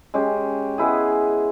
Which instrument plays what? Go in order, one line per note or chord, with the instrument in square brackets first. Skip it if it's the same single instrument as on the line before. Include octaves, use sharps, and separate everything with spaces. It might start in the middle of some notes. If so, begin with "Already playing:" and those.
[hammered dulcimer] G#3 C#4 G4
G#3 B3 E4 G#4